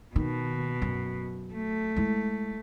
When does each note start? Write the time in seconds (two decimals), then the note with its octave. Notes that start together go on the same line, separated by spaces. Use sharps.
0.16 B2 D#3
0.82 F#2
1.53 A3
1.96 G#3 E4